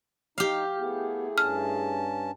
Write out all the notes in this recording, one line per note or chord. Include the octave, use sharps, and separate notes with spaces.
D#4 G4 F5
A3 B3 E4 G#4
G2 C#4 A5 F6